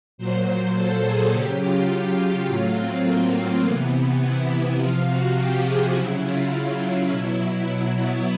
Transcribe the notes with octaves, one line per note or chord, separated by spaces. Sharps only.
A#2 F#3 C5
A4
G#4
C#3 F#3 G4
F4
A2 F#3
C4
A#3
C3 E3 B3
E4
E4
C3 F3 F4
F#4
G4
G#4
C#3 F#3 E4
F4
E4
B2 F#3
E4
B3